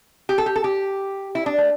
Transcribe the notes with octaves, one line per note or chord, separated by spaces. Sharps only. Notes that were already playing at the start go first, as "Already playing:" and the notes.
G4
A4
G4
A4
G4
E4
D4
A3